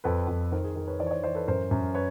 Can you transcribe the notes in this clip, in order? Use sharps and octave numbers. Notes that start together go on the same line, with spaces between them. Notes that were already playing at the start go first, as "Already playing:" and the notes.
F2 A4 B4
F2
D#3 A#4 C5
G#4
D#3 G#4
B4 C#5
E3 C5 D5
C#5
C5 D5
E3 C5 D5
A4 B4
F#2 A#4 C5
F#2
B4 C#5